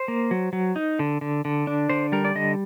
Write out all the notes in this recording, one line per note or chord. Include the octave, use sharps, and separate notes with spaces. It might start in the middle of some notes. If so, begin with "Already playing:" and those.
Already playing: C5
A#3
F#3
F#3
D#4
D3
D3
D3
D4
D3 C5
G3 A#4
D5
D3 D#5